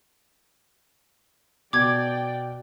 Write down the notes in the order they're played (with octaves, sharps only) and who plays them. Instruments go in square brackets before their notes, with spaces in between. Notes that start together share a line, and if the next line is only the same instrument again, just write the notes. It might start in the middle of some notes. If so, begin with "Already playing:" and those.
[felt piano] B2 [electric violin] D5 G5 [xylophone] D6 G#6